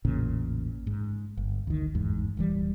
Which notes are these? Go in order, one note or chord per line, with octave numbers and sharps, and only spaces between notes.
A1 E2 A#2 C#3
G#2
G1
D2 D#3
G1 E2 G#2
D#1 E3 G3